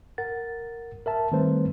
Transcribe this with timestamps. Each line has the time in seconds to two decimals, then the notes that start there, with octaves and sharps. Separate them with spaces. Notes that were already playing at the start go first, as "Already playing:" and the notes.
0.18 A#4 F#5 A6
1.06 A#4 E5 A5
1.32 D#3 G3 A3 C4 B4 C5